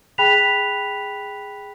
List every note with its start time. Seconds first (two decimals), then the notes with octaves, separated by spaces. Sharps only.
0.18 G#4 G5 B5 F#6 B6 F7